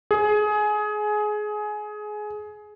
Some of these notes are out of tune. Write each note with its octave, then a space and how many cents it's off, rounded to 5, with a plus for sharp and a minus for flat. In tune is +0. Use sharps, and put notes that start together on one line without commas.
G#4 +20